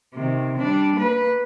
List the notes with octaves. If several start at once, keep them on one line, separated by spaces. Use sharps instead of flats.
C3 D#3
G3 D4
A#3 B4